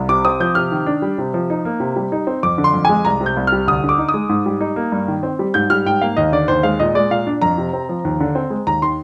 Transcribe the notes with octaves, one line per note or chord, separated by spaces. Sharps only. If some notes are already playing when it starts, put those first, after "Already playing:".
Already playing: C2
C3 D6
C4 D#6
F3 G6
C3 F6
D#3
D4
G3
C3
F3
D#4
A#3
C3
G3
D#4
C4
F2 D6
D3
C6
F2
G#3 G#5
C2 A#5
C3
G6
C2
G3 F6
D2 D#6
D3
D6
D#4
D#6
G#3
G#2
G3
D#4
A#3
G2
D#3
C4
G3
G#2 G6
G3 F6
G#2 G5
A#3 F5
D#2 D#5
D3 D5
D#2 C5
G#3 F5
A#2 D#5
G#3 D5
A#2 F5
D4
F2 A#5
C3
C4
F3
D#2
D3
C4
G#3
D#2 A#5
D#3 C6